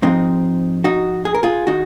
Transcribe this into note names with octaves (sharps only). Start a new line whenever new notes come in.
G#2 F3 G#3 C4 D#4
D#4 F#4
G#4
A#4
F4 G#4
D#3 G#3 D#4 F#4